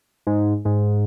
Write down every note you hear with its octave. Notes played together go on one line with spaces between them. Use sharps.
G#2
G#2